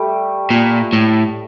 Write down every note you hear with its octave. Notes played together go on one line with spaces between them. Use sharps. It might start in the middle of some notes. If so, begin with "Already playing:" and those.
Already playing: G3 A3
A#2
A2